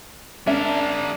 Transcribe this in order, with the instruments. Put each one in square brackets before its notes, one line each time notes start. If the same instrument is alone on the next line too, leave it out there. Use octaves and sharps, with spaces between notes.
[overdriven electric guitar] G#3 A#4 [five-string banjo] C#4 E5 [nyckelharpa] D4